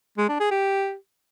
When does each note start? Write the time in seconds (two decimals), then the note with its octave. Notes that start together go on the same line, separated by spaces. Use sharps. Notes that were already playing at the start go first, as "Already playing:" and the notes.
0.18 G#3
0.29 D4
0.40 G#4
0.51 G4